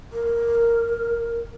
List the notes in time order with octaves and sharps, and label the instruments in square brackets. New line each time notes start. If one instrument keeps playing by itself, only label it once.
[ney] A#4